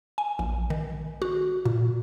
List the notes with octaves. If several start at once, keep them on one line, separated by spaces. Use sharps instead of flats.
G#5
A#1
D#3
F#4
A#2